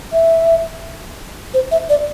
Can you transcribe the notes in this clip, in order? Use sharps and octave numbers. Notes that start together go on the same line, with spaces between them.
E5
C5
E5
D5